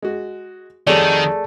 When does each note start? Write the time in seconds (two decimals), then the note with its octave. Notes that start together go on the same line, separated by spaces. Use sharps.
0.02 G#3 F#4
0.87 F2 D#3 G3 A3 G#4 C#5 D5